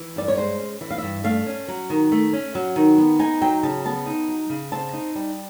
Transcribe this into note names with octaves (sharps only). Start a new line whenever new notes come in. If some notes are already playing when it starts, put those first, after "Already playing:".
Already playing: E3
G2 D5
C#5
G#3 C5
C#4
E3 E5
F5
G2 E5
A3 F5
C#4
F#3
D#3
A3
C#4
F#3
D#3
B3
D#4 G#5
F#3 G5
C#3 A5
B3 A5
D#4
F#3
C#3
C4 A5
D#4
G3